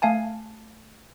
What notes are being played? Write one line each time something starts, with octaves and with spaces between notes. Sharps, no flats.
A3 F5 G#5 A5